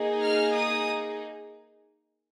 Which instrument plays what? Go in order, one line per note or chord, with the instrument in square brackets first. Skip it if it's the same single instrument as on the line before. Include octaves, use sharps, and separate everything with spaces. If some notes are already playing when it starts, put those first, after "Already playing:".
Already playing: [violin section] A#3 D#4 G#4
F6
D#6